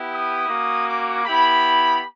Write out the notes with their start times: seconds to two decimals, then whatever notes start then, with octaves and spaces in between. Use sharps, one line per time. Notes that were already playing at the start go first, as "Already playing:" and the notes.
Already playing: B3 E4 G4
0.12 D#6
0.49 A#3 C#4 F#4
0.87 D6
1.25 B3 E4 G4 B5